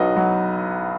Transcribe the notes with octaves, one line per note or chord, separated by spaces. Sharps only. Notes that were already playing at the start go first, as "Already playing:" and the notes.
Already playing: B1 F#3 B4 D#5
F#3